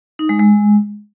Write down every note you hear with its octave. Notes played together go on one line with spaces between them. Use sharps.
D#4
G#3
G#3